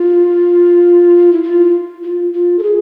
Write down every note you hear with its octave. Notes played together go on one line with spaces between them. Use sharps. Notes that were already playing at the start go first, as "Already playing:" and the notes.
Already playing: F4
E4
F4
F4
F4
A4
G#4